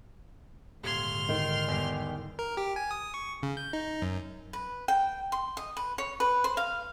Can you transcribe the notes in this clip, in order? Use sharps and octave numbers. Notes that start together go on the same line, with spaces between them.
D#1 G#2 D3 C6 F6 G#6
D#3
E2 G3
A#4
G4
G#5
D#6
C#6
C#3
G6
D#4
F#2
B4
G5
C6
D#5
B4
C#5
B4
C5
F5